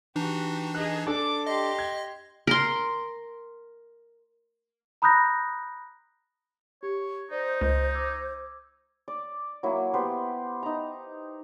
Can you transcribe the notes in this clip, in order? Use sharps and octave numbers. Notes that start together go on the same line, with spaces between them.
E3 D4 D#4 F#4 G4
G#4 D#5 F#6
D4 A4 D6
G4 D#5 C6
G#6
A#4 C6
A#5 B5 D#6 F#6 G6 A#6
G4 C#5
D#4 C5 D5
C#2 D#5
D6 E6 G#6
D5
F#3 A#3 E4
B3 G4 B4 C5
D#4 A#5